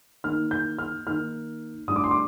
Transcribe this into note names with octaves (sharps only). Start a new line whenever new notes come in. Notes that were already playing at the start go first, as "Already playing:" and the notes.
D#3 A#3 D#4 F6
G6
F6
D#3 A#3 D#4 F6
A2 G3 D4 D#6
D6
C6
D6